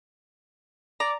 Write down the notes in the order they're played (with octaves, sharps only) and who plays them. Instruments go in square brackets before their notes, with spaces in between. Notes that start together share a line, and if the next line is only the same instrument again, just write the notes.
[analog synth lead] D5 [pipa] A#5